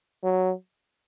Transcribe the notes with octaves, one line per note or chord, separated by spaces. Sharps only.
F#3